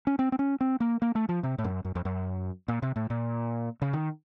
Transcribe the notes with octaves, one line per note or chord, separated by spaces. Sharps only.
C#4
C4
C4
C#4
C4
A#3
A#3
A3
F3
C3
A2
F#2
F#2
F2
F#2
A#2
C3
A2
A#2
C#3
D#3